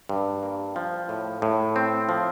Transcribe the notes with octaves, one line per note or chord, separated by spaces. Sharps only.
G2
A#3
F3
A2
A2
C4
F3